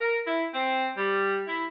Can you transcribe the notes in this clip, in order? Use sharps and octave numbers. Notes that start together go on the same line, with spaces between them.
A#4
E4
C4
G3
E4